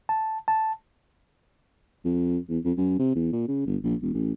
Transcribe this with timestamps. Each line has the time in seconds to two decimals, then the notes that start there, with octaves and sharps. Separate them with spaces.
0.09 A5
0.48 A5
2.05 F2
2.49 E2
2.65 F2
2.77 F#2
2.99 C3
3.15 E2
3.33 A#2
3.48 C#3
3.66 G1
3.83 A#1
4.02 E1
4.14 A1